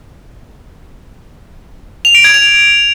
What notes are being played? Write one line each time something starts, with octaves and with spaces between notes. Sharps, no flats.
F7
D7
G#6
F7